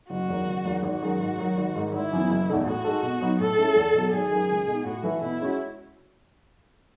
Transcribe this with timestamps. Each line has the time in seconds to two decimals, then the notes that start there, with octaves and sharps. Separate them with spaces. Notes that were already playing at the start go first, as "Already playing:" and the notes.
0.10 F#1 F#4
0.29 E2 D#3 F#3
0.47 F#1
0.64 E2 D#3 F#3
0.83 G#1 F#4
1.02 F#2 D#3 G#3
1.20 G#2
1.38 D#3 F#3
1.57 G#1
1.75 G#2 D#3
1.93 G#1 E4
2.11 F#2 E3 B3
2.29 F#1
2.48 E2 B2 A3 D#4
2.66 A2 F#4
2.84 G#3 D#4 A4
3.03 B2
3.20 F#3 B3 D#4
3.39 A2 A4
3.57 G#3 C#4 E4
3.76 E2
3.93 B2 F#3
4.12 G#1 G#4
4.31 F#2 D#3 A3
4.49 C#2
4.67 B2 A3 D#4
4.85 A2 F#4
5.03 E3 A3 E4 B4
5.21 B2 E4
5.41 G#3 C#4 F#4